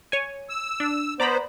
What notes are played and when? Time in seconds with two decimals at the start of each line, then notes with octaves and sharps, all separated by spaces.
0.12 C#5 G#5
0.50 E6
0.80 D4
1.20 B3 C5 D5 A#5 B5